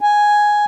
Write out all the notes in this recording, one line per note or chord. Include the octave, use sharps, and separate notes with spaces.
G#5